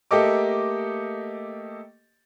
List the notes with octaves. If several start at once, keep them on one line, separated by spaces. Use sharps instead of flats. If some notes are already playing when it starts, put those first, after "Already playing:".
A3 A#3 G4 A4 D#5 D6